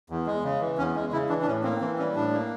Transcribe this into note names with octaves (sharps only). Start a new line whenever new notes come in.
E2
G#3
C#3
E3
E2 C#4
G#3
C#3 E4
E3 D4
D4
A2 C#4
A#3 C4
E3 C4
G3 C#4
A2 D4
A#3